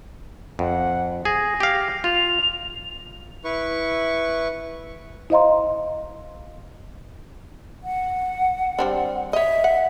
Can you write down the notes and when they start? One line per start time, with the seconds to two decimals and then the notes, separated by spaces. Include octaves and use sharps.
0.59 F2 F#5
1.25 G#4 A#6
1.60 G4 F5
2.04 F4 F7
3.44 E4 B4 C#6
5.30 E4 C5 D#5 F5 A#5 C6
7.84 F#5
8.79 G3 C4 D4
9.33 C#5 D#5 E5
9.64 F#5